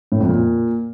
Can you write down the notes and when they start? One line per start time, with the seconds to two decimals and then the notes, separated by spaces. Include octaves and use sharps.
0.12 A2
0.20 F2
0.29 A#2